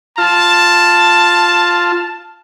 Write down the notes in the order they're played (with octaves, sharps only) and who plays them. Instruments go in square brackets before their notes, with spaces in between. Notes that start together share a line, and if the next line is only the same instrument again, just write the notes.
[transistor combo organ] F4 [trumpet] A5